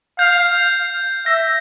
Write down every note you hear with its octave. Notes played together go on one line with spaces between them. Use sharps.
F5 G6
E5 A#6